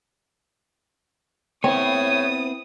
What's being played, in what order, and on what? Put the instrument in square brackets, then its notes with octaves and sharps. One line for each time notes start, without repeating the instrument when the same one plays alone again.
[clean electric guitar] B3 C4 E4 [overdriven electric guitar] A4 C#5 [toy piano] G5 [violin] D#6